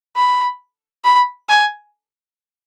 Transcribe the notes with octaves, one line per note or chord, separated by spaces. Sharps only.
B5
B5
G#5